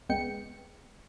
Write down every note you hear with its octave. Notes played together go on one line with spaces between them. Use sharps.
C#2 G#3 B3 G5 C#7